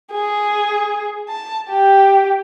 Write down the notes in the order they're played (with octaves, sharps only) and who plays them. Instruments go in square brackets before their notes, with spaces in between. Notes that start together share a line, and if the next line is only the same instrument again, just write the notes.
[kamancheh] G#4
A5
G4